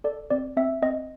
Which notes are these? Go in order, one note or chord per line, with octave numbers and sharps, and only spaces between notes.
A4 D5
C4 D5
C4 E5
C4 D#5